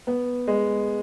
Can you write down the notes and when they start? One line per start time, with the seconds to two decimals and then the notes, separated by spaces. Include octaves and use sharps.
0.07 B3
0.48 G#3